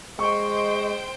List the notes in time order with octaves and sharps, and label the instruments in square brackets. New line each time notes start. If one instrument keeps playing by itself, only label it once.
[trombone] G#3 [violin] C5 G5 [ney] D#5 [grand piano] C#6